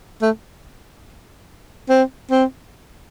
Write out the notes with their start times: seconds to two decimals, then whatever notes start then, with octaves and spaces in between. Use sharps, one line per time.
0.22 A3
1.90 C4
2.31 C4